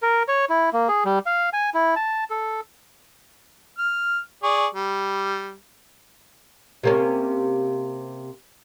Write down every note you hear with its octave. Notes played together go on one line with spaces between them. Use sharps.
A#4
C#5
E4
A#3
G#4
G3
F5
G#5
E4
A5
A4
F6
G#4 D5 C#6
G3
C3 A#3 C#4